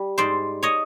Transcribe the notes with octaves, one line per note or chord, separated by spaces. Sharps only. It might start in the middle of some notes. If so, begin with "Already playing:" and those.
Already playing: G3
G#2 C5 D5
C#5 D#5